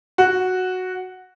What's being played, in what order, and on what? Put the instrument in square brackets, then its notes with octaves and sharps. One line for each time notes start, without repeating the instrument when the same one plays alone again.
[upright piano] F#4